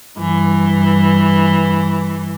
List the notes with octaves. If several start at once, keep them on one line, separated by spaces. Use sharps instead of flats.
G2 E3